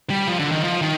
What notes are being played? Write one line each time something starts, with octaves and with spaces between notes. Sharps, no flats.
G3
F3
D3
D#3
F3
D#3